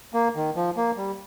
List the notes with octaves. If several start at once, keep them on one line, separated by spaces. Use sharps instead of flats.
A#3
D#3
F3
A#3
G3